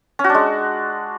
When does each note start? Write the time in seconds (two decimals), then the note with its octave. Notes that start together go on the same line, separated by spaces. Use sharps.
0.19 C#4
0.24 F#4
0.29 D4
0.35 G#3